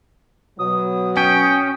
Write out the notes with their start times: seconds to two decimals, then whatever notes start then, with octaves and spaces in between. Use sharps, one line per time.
0.59 B2 F#3 D#6
1.17 C#4 G5